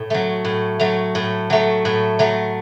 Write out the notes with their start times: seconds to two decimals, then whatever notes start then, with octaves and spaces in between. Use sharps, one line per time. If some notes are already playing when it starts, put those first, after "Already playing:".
Already playing: A2
0.10 F#3 A3
0.45 A2
0.80 F#3 A3
1.15 A2
1.50 F#3 A3
1.85 A2
2.19 F#3 A3